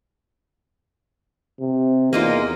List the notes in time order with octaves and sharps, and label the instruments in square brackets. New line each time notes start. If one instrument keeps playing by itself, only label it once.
[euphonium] C3
[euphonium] E2 [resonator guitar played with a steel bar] A#3 D#4 F4